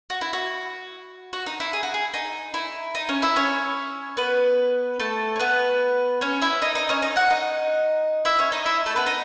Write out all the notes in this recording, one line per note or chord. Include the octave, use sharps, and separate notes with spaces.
F#4
E4
F#4
F#4
D#4
E4
G#4
F#4
G#4
D#4
E4
D#4
C#4 C#5
E4 E5
C#4 C#5
B3 B4
A3 A4
C#5
B3 B4
C#4 C#5
E4 E5
D#4 D#5
D#4 D#5
C#4 C#5
D#4 D#5
F#4 F#5
D#4 D#5
E4 E5
C#4 C#5
D#4 D#5
E4 E5
A3 A4
B3 B4
D#4 D#5